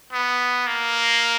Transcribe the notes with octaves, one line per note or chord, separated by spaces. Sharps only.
B3
A#3